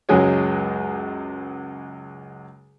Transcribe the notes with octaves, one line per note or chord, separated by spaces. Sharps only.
C#2 F#2 F#3 G#3 G#4 C#5